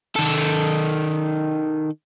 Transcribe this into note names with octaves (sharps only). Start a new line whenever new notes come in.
D#3 A4